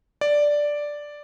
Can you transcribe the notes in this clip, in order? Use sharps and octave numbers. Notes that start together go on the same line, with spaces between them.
D5